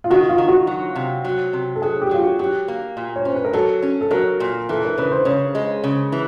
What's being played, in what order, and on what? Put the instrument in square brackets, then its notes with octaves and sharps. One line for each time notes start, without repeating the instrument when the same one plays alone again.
[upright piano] F4
[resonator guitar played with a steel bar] D#3 [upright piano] F#4
[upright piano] F4
[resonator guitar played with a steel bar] D#3
[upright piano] F#4
[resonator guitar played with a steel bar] F#3
C3
F#3
C3
[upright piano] A4
[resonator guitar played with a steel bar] F#3 [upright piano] G#4
[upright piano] G4
[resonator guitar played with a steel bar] F#3 [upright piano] F4
[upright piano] F#4
[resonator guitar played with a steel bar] F#3 [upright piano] G4
[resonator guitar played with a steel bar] A#3
A#2
[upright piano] C#5
[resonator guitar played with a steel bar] C#4 [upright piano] C5
[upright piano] B4
A#4
[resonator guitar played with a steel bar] F#3 [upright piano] A4
[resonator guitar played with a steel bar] C#4
[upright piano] A4
[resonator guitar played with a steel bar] F#3 [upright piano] A#4
[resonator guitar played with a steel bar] A#2
[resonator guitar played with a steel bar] E3 [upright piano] A4
[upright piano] A#4
[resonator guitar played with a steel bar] C#3 [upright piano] B4
[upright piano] C5
[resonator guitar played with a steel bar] C#3 [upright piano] C#5
[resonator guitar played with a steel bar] G#3
C#3
E3